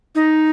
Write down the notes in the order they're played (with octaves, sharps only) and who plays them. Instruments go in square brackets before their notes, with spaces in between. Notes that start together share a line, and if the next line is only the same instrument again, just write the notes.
[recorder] D#4